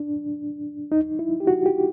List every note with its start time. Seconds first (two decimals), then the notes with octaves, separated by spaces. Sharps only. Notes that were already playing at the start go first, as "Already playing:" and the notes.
Already playing: D4
0.92 D#4
1.19 E4
1.40 G4
1.47 F#4
1.66 G4